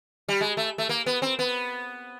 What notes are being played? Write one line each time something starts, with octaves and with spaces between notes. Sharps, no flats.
G3
G#3
A3
A3
A#3
B3
C4
B3